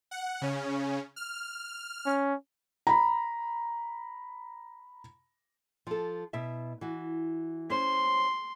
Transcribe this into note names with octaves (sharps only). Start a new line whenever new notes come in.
F#5
C#3 C#4
F6
C#4
A#5 B5
F3 A4
B2 E4 E5
E3 F#4
C#4 C5 C6